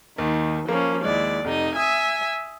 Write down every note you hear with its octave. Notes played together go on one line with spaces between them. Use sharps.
D#2 D#3
F3 A#3 C#4
D#2 G#3 E4 D5
F1 D#4 D#5
E5 G#5 D#6